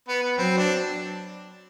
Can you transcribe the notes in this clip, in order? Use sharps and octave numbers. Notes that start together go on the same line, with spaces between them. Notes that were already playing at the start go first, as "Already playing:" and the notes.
B3
B3
F#3 C4
D4